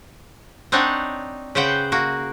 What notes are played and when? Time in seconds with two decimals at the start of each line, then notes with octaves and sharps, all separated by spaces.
0.72 C4 D4 D#4 C#5 F#5
1.55 C#3 B4 C5 F#5 G5
1.92 A#3 F#4